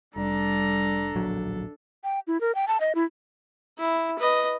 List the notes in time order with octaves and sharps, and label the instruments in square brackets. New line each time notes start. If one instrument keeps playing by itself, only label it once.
[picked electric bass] F1 [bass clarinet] G3 [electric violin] D4 A4 [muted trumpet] A#5
[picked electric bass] D1 A#1 F#3
[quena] G5
E4
A#4
G5
A5
D#5
E4
[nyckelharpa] E4
B4 D#5